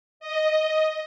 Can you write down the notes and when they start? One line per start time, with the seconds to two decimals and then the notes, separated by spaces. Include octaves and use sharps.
0.20 D#5